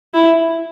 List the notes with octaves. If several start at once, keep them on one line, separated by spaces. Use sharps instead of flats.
E4